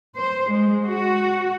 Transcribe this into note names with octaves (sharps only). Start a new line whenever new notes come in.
C5
G#3
F#4